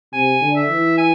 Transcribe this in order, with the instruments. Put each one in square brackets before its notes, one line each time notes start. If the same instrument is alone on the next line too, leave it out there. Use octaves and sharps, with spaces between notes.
[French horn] C3 [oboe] G#5
[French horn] D3
[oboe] E5
[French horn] E3
[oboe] G#5